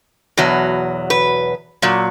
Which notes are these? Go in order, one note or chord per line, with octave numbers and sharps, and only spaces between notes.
E2 B2 F#3
B4
A#2 F#3